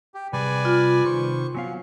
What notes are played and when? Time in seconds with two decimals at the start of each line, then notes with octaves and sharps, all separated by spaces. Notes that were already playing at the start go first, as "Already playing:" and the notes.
0.14 G4
0.33 C3 G3 G#4 B4 D5 G#5
0.65 F4
1.05 C3 D#3 C5 C#6
1.55 F#3 B3 C#4 F5